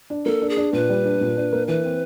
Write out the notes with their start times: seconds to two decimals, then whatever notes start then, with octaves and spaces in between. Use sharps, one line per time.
0.10 D4
0.26 A#3 A4
0.42 D4
0.50 G#4
0.57 D4
0.73 A#2 B4
0.89 G3
1.05 D4
1.21 A#2
1.37 D4
1.53 A#3
1.68 E3 B4
1.84 C4